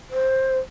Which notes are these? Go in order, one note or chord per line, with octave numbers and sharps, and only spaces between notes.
C5